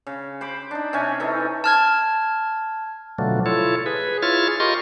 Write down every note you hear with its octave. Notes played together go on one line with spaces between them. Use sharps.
C#3
C5 B5 D6
D4 D#4
C3 C#4 G#5
E3 D#4 A4
A5 F6 G#6
B2 D3 F3 F#3 A3
E4 F4 A4 C#5
G#4 B4
E4 F4 G#4 C#5 F6 A6
F4 G4 A#4 D#5 C6 C#6